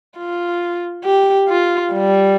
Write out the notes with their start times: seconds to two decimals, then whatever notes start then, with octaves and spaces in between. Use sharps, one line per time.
0.18 F4
1.05 G4
1.49 F4
1.92 G3